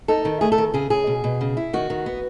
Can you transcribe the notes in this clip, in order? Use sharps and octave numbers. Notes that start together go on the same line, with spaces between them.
D#4 A4
D#3
A3 G#4
A4
D#3
C#3 G#4
C#3 G#4
B2
B2
C#3
E4
D#3 F#4
D#3
B3